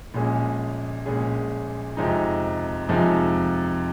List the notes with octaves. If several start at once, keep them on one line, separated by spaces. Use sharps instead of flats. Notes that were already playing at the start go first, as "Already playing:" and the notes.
A#1 A#2 G#3 C#4 G#4
A#1 A#2 G#3 C#4 G#4
F2 C3 F3 G#3 D#4
F2 C3 F3 G#3 D#4